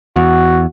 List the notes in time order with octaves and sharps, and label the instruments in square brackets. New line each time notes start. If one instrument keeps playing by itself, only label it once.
[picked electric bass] E2 [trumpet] F#4